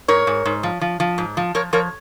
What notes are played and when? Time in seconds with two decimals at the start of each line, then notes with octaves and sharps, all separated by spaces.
0.08 G#2 A#4 C#5
0.27 G#2
0.45 G#2
0.63 F3
0.81 F3
1.00 F3
1.18 G#2
1.37 F3
1.55 F3 A#4 C#5
1.73 F3 A#4 C#5